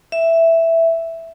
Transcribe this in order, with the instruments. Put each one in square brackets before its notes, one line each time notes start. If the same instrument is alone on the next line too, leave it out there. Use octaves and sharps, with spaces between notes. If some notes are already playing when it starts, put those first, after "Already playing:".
[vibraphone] E5